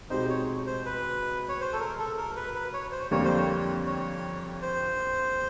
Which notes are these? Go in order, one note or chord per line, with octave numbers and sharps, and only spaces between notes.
B2 G#3 C4 D#4 G4 C5
C#5
C5
B4
C#5
C5
A4
A#4
A4
A#4
B4
B4
C#5
C5
F2 D3 G3 A#3 C#5
C5
C#5
C#5
C5